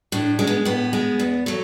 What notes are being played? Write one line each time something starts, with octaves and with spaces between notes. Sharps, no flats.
A2 D4
G#3 C#4
B3
A2 B3
G#3
E2
F#3 A3